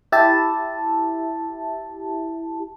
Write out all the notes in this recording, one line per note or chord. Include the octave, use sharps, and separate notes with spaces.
E4 G4 E5 A5